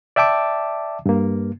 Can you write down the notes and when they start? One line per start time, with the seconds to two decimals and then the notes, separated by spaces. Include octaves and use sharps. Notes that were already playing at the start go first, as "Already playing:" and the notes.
0.16 D5 E5 G5 A5 D6
1.06 G2 A#3